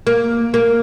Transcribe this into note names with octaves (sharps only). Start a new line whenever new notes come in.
A#3
A#3